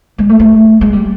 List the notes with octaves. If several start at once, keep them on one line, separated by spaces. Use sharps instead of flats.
G#3
A3
A3
G#3
G3